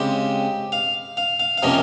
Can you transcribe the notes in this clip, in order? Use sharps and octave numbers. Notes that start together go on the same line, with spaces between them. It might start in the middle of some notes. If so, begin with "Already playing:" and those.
Already playing: C#3 G#3 C4 G4
F5
F5
F5
F5
C3 F3 A#3 C#4 D#5